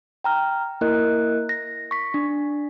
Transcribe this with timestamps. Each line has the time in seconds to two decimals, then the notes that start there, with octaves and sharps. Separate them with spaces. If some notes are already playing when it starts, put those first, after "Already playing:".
0.24 G5 A#5 F6
0.81 A#3 E4 A#4 D#5 F#6
1.49 A#6
1.91 C#6 B6
2.14 D4